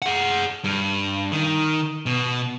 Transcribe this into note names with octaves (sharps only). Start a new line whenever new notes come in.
G#4 F#5
G2
D#3
B2